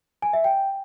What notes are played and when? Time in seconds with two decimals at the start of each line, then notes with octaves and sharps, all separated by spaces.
0.22 G#5
0.33 E5
0.44 G5